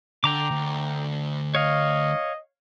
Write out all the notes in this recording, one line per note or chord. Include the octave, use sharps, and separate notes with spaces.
D3 G5 A#5 D6
D2
C#5 D#5 F5